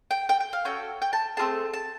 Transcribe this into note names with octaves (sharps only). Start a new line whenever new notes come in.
G5
G5
G5
F5
C#4 F#4 A4 G5
G5
A5
A3 C4 F4 G#4 A5
A5